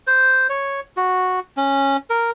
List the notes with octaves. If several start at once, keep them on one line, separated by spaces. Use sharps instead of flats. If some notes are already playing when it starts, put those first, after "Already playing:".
C5
C#5
F#4
C#4
A#4